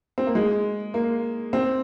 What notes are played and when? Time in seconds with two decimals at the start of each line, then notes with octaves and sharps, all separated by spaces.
0.18 C4
0.27 A#3
0.35 G#3
0.94 A#3
1.53 C4